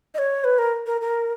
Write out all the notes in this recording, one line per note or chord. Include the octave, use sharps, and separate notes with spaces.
D#5
C#5
B4
A#4
A#4
A#4